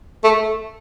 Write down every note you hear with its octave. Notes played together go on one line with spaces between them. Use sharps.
A3 A4